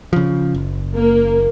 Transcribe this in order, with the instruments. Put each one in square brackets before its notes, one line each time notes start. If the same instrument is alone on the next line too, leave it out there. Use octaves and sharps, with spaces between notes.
[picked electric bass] C#3 F3
F#1
[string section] A#3